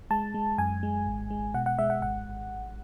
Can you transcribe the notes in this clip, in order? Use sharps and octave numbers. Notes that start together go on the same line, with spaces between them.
G#3 A5
G#3
F#2 G#5
G#3
G#1
G#3
B2 F#5
F#5
G#3 E5
F#5
G#1 F#5